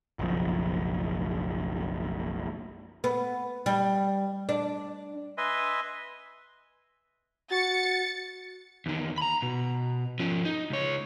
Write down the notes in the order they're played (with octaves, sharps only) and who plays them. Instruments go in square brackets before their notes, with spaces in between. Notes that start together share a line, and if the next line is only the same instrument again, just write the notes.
[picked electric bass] F#1 B1 F3
[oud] B3
G3
D4
[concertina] B4 D#5 E5 G#5 C6
[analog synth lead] F#4 [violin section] A6 C#7
[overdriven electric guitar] E2 D#3
A#5 B5
B2
F3 C#4
D#4
C#2 C#5